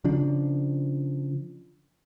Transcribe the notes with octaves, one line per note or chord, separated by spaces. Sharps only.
C#3 F3 D4